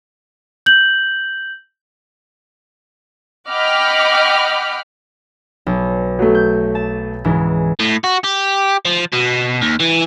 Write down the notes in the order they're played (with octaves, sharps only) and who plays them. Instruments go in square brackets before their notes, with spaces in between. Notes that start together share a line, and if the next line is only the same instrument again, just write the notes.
[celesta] G6 F#7
[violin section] D#5 F#5 G5 B5 D6 F6
[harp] B1
[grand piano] F#3 A3
[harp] G6
A5
C#2 G#2 E3
[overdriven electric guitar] A2
F#4
G4
F3
B2
D#2
E3